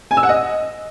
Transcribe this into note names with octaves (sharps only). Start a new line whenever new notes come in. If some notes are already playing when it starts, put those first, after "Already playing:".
G#5
E6
F#5
D#5